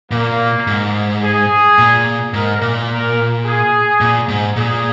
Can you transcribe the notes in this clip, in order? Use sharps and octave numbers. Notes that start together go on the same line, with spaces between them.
A#2 A#3
G#2
G#4
A#2
G#2 A#4
A#2
A#4
G#4
A#2
G#2
A#2 G#4